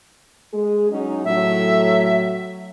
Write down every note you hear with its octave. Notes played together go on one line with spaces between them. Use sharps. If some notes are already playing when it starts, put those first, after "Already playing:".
G#3 G#4
F#3 C#4 D#4
A2 F#3 E5